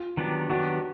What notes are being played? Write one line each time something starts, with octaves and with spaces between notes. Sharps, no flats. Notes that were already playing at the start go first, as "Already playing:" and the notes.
Already playing: F4
D#3 F#3 B3 D4 G4
D#3 F#3 B3 D4 F#4 G4